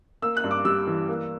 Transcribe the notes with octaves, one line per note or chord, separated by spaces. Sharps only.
A#3 E6
F#6
G2
D6
G3 E6
E3
A#3